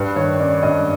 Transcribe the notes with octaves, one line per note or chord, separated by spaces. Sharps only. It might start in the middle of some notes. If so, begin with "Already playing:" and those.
Already playing: G2 B4
D#3 C#5
C#4 D5
G2 D#5